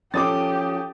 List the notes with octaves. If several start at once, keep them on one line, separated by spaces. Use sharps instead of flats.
F3 C#4 G4 A4 D6 D#6 A6